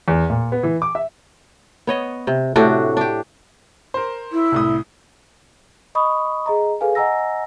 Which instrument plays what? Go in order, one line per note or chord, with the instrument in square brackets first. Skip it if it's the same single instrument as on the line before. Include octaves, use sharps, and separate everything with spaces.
[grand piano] E2
A#2
B3
E3
D6
E5
[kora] B3 C#5 D#5
C3
A2 C3 D4 F#4
D4 G4
[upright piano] A#4 C5
[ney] E4
[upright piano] C2 A2 D#6
[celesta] D#5 B5 C#6 D#6
G#4 D#5 A#5
G#4 A4 B4 F5 G#5
D#5 F#5 G#5 A#5 E6 A#6